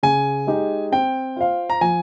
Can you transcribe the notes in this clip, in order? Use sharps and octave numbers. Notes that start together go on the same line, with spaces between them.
C#3 G#5
G#3 D#4 G4
C4 G5
F4 C5 F5
A#5
F3 G#5